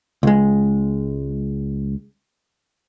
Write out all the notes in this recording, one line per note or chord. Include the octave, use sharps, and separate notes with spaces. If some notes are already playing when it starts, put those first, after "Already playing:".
C#2 G#3